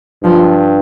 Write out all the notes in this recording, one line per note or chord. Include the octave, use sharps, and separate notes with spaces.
G2 F3